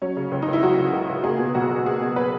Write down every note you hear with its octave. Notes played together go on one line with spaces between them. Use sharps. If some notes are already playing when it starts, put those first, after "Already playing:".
F#3 C#4
C#3
C#2 C#4
D#4
C#2
E4
F#3 F#4
C#3
C#2
C#2
A#3 G#4
B2
B1 F#4
B1
A#3 G#4
B2
B4